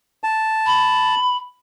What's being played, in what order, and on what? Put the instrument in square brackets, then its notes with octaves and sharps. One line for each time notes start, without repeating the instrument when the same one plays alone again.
[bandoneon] A5
[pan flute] B5